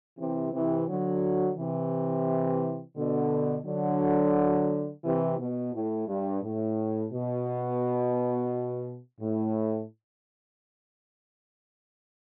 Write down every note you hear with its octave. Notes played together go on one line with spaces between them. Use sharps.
C3 E3
C3 E3
D3 F#3
C3 E3
B2 D3
D3 F#3
C3 E3
B2
A2
G2
A2
B2
A2